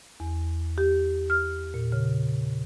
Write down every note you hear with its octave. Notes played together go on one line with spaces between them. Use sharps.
E2
G4
F6
A#2
C#3